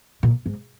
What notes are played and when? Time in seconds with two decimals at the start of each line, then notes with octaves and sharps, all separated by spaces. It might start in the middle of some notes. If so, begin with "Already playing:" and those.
0.23 A#2
0.46 G#2